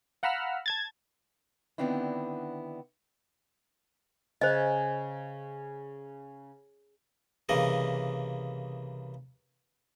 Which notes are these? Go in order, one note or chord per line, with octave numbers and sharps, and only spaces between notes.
F5 F#5 A#5 B5 E6 F6
A5 G#6 A6
D3 D#3 B3 C4 D4 E4
C#3 C5 D#5
C2 C#3 E3 A#3 D#5